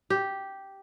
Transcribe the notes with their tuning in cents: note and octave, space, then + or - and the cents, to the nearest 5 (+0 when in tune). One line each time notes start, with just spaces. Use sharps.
G4 -5